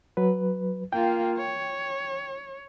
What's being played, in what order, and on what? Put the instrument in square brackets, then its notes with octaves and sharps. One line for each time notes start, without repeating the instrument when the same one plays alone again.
[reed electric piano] F#3 B4
[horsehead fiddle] A#3 F4 [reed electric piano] G5
[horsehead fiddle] C#5